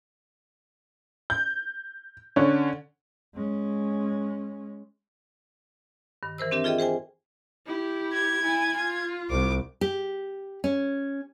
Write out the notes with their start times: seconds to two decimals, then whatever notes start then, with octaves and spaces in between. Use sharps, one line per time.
1.30 G6
2.36 D3 C#4
3.34 G#3 C#4
6.23 G2 D#3
6.38 E3 A#4 C5 E6
6.51 C4 D4 G4 A#4 E5
6.64 F4 G#4 A4 D#5 E5 G5
6.78 G#4 C5 G5 G#5
7.67 E4 G4
8.13 G#6
8.43 E4 G#5
8.77 F4
9.30 C2 D6
9.81 G4
10.64 C#4